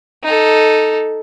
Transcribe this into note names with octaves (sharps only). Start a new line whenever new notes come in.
D#4 A4